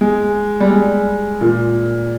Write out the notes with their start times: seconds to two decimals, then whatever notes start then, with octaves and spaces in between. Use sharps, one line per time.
0.01 G#3
0.60 G3
0.70 G#3
1.41 A#2